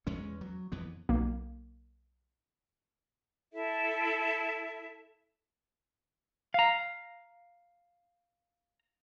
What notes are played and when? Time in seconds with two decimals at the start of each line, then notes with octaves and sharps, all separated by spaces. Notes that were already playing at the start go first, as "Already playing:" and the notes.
0.07 E2 G#3 C#4
0.41 F#3
0.72 F2 E3 B3
1.09 B1 A#3
3.53 E4 A4 E5
6.54 F5 A#5